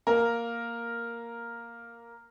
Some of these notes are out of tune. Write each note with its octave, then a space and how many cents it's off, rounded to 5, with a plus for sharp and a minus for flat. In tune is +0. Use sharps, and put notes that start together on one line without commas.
A#3 +0 A#4 +0